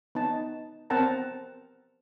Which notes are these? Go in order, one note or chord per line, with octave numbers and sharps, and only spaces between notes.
B3 D#4 A5
B3 C4 A#4 F#5 A5 A#5